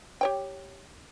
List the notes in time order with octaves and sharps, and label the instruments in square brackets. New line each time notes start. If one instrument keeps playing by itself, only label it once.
[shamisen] G4 C#5 G5